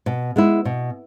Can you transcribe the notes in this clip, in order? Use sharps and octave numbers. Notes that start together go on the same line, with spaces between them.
B2
G#3 B3 E4
B2